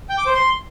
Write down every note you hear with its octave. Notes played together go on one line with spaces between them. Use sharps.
G5
D6
C5
C6